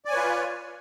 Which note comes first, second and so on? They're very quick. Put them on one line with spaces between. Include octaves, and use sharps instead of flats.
D5 G#5 C#5 B4 F4